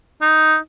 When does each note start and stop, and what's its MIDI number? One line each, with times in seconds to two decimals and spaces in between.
0.21 0.57 63